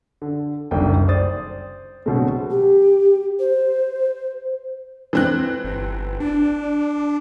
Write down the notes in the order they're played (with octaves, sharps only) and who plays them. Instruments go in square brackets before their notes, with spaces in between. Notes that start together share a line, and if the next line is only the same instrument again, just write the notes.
[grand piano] D3
F#1 C2 D3 D#3 G5
C5 D5 D#6 A6
B2 D3 F#3 G#3 A3 C4
[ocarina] G4
C5
[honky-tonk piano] E3 C4 F#6
[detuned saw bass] G1
D4